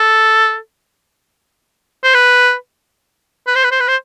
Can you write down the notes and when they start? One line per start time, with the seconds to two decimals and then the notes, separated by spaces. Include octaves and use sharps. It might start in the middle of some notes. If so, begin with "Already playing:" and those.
Already playing: A4
2.04 C5
2.14 B4
3.47 B4
3.55 C5
3.64 B4
3.72 C5
3.80 B4
3.88 C5